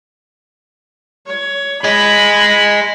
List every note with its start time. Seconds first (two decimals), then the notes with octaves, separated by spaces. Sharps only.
1.26 C#5
1.84 G#4 D#5 B5